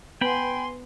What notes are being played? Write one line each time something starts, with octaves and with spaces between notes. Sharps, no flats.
B3 G5 G#5 B5 C6